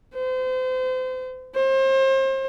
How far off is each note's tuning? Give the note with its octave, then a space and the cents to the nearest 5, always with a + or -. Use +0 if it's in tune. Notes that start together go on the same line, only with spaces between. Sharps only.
C5 -35
C5 +35